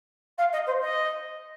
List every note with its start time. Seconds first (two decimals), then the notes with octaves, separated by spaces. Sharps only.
0.38 F5
0.52 D#5
0.67 C5
0.81 D#5